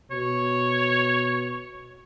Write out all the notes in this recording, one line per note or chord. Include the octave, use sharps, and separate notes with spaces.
B2 C#5